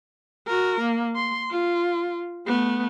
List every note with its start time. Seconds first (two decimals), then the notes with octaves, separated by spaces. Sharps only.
0.47 F#4 A#4
0.81 A#3
1.16 C6
1.51 F4
2.47 A3 B3